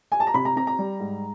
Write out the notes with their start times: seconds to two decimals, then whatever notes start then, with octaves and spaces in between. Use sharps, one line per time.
0.12 G#5
0.20 A5
0.27 A#5
0.34 C3 B5
0.45 A#5
0.56 C4 A#5
0.67 A#5
0.79 G3
1.00 G#2